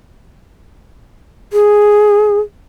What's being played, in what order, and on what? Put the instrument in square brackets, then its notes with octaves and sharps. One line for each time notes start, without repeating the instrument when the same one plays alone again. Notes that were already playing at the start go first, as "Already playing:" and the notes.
[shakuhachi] G#4